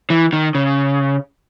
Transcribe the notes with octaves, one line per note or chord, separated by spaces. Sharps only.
E3
D#3
C#3